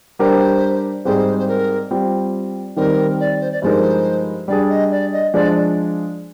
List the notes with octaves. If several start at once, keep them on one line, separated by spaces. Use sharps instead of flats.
G3 D4 G4 A#4 C5
G#2 G3 C4 D#4 G#4 C5
C5
A#4
G3 C4 F4
D#3 G3 C4 A#4
D5
C5
D5
G2 F3 G#3 D#4 A#4 C5
G3 D4 G#4 D5
D#5
D5
D#5
F3 G#3 D4 D5